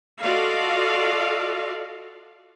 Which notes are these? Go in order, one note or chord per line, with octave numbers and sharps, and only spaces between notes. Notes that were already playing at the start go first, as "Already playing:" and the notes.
F4 F#4 A4 D5 D#5 F5